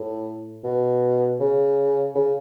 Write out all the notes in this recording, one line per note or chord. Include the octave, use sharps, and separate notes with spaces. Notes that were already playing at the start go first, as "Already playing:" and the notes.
Already playing: A2
B2
C#3
C#3